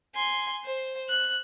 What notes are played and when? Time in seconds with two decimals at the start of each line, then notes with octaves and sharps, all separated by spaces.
0.15 G#5 C6
0.64 C5
1.09 F#6